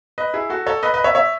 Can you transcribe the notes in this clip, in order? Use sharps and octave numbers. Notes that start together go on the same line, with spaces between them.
B4 D#5
E4 G#4
F#4 A4
A4 C#5
B4 D#5
B4 D#5
C#5 E5
C#5 E5